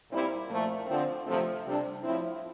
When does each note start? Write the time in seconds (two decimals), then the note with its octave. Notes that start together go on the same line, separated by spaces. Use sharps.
0.10 A#2 G3 C4 E4
0.48 A#2 F3 A3
0.87 D3 F3 C4
1.26 D2 C3 F3 A3 C4
1.65 C3 G3 D4
2.03 A2 F3 C4 E4